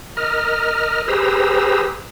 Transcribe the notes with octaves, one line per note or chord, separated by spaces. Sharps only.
A#4 D#5 F6
G4 G#4 B4 C5 A#5 E6